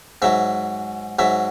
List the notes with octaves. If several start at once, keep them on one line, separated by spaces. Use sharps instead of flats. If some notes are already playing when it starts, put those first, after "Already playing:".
G#2 F#3 E5
G#2 F#3 E5